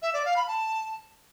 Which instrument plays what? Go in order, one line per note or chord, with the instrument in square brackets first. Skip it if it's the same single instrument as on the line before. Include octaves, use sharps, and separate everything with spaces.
[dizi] E5
D5
F5
B5
A5